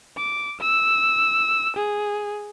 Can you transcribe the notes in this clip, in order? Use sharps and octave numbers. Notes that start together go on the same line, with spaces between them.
D6
E6
G#4